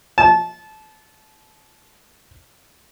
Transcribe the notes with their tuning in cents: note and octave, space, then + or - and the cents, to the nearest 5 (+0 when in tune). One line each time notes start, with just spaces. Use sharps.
A5 -25